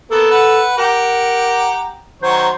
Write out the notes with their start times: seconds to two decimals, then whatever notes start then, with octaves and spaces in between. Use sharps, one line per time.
0.11 A#3 B3 A4
0.31 B4 F#5
0.78 G4 A#4 F#5 A#5
2.22 D#3 F#3 C5 C#5